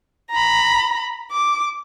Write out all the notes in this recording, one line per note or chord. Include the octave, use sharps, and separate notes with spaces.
A#5 B5
D6